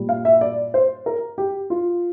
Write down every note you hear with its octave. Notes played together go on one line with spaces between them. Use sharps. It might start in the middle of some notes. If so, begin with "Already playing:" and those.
Already playing: A#2 G3
F5
E5
D5
C5
A#4
G4
F4